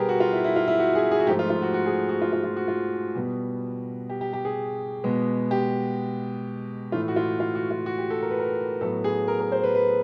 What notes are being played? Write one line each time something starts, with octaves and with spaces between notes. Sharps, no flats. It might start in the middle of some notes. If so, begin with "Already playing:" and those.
Already playing: B2 G3 B3 G4 G#4 A#4 B4
F#4
F4
E4
E4
F4
E4
F#4
G#4
G#4
F#4
G#2 F3 A3 G4
F4
F4
F#4
F#4
G#4
F#4
F4
F4
F4
F#4
F4
B2 G3 B3
G4
G4
G4
G#4
B2 G#3 B3
G4
A2 E3 A3 F4
F#4
F4
F4
F#4
F4
F#4
G4
A4
A#4
B4
A#4
A2 F#3 B3 A4
G#4
A#4
A#4
C5
B4
B4